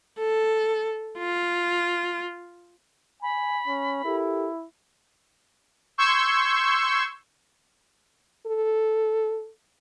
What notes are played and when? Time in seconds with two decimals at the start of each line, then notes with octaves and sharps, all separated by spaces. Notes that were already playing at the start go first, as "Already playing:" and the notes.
0.18 A4
1.18 F4
3.22 G#5 B5
3.67 C#4
4.05 E4 G4 A4 A#4
5.98 C6 C#6 E6 G6 G#6
8.47 A4